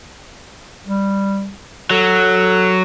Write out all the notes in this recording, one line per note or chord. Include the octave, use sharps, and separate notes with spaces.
G3
F#3 A4